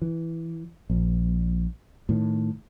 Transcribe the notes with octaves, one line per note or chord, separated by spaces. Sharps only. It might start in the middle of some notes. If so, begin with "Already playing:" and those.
E3
A#1
A2 D#3